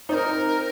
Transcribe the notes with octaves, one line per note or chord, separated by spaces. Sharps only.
C4 D#4 D5
A#4